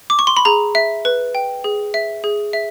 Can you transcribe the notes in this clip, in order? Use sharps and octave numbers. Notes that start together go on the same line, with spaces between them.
D6
C#6
C6
B5
G#4 A#5
E5
B4
G5
G#4
E5
G#4
E5